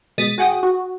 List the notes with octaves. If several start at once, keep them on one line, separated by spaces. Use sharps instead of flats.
B2 G#3 D#6 A6 B6 D#7
F#4 G#4 F#5 G5 D#6
F#4